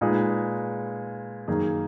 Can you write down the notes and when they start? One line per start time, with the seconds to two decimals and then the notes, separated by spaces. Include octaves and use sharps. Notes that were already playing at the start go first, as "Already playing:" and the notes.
0.01 A#2 G#3 D#4 G#4 B4
1.48 F#2 D#3 A#3 D#4 G#4